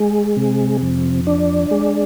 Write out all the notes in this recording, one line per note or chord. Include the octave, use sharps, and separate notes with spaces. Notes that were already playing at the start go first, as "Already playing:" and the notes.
Already playing: G#3
C3
F2
D4
G#3